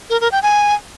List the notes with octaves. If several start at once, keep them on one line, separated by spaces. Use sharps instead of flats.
A#4
A#4
G5
G#5